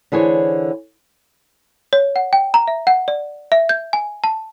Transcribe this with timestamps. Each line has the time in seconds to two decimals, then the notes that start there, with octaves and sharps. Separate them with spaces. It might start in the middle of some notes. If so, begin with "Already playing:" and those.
0.12 D3 E3 G#4 C5 C#5
1.93 C#5
2.16 F#5
2.33 G5
2.54 A#5
2.68 E5
2.87 F#5
3.08 D5
3.52 E5
3.69 G6
3.93 G#5
4.24 A5